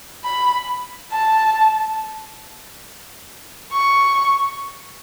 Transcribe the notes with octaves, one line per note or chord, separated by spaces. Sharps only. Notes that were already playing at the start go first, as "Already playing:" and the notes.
B5
A5
C#6